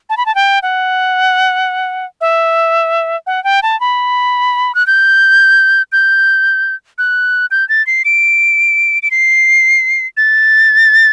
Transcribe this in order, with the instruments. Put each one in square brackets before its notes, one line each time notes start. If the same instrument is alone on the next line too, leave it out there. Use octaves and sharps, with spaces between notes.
[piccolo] A5
B5
A5
G5
F#5
E5
F#5
G5
A5
B5
F#6
G6
G6
F#6
G6
A6
C7
D7
D7
C7
A6